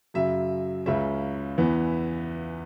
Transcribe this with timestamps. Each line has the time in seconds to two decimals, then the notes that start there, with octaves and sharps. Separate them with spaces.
0.14 F#2 C#3 F#3 E5
0.86 C#2 C#3 G#3 C#4 E5
1.58 E2 E3 B3